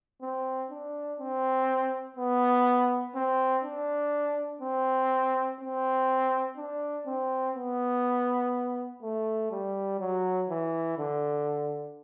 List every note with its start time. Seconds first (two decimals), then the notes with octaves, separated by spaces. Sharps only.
0.22 C4
0.71 D4
1.20 C4
2.17 B3
3.15 C4
3.64 D4
4.61 C4
5.60 C4
6.57 D4
7.06 C4
7.56 B3
9.03 A3
9.51 G3
10.00 F#3
10.50 E3
10.98 D3